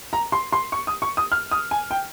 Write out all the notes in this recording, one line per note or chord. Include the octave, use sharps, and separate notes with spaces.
A#5
C6
C6
C#6
D#6
C#6
D#6
F6
D#6
G#5
G5